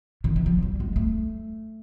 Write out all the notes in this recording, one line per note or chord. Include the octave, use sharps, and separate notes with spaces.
D#3
E3
F3
G3
G#3
A3